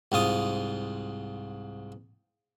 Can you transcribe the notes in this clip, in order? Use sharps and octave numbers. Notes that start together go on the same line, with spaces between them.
C2 G#2 F4 D#6